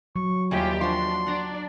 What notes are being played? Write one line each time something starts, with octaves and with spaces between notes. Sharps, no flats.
F#3 C#6
D#2 G3 F4 G4 D#5 E5 G#5
F3 D4 F#4 C6
D4 D5 F#5 A#5